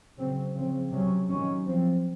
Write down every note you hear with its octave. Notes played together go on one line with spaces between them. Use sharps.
C#3 F#3 C4
C#3 F3 C4
C3 F#3 C#4
D#3 F#3 C#4
F3 C4